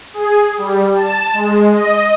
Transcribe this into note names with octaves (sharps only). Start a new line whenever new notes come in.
G#4
G3
A5
G#3
D#5